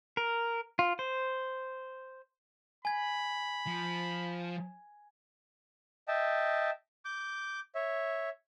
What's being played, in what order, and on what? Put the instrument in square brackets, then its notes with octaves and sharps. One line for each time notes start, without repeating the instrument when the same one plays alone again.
[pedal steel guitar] A#4
F4
C5
[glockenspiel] G#5 G#6 [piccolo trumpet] B5
[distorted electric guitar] F3
[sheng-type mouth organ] D#5 E5 G5 A5
D6 G6
C#5 E5